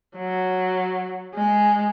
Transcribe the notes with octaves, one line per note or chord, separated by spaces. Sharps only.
F#3
G#3